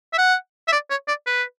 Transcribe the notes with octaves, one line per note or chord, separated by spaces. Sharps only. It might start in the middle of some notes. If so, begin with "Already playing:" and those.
E5
F#5
E5
D5
C#5
D5
B4